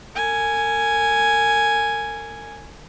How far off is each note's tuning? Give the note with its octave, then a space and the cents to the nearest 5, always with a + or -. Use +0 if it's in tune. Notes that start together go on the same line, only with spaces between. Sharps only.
A#4 -40 G#5 +0